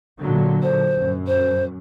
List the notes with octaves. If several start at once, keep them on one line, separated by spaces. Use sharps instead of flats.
A#2 D3 F#3
C5
F#2
C5